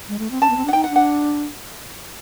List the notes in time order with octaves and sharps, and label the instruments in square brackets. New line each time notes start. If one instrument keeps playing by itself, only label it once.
[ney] G#3
A3
C4
[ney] C#4 [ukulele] A5
[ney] B3
C4
[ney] D4 [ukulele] F#5
[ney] D#4 [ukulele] G5
[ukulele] F#5
[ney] D4
[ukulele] F#5